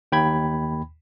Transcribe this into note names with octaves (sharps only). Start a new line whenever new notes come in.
D#2 G5 B5 G#6